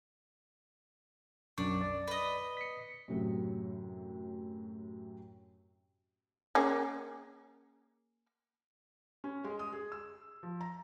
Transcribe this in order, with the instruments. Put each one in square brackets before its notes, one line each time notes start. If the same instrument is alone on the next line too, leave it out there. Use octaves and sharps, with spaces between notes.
[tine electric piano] B1 F#2 C#6 [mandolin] D4
[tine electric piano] D5
[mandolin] B4 D#5
[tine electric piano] B6 C#7
[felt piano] F#2 A2 C3 F#3
[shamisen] A#3 C#4 G#4
[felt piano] C#4
G#3
D#6
G#4
E6
F3
A#5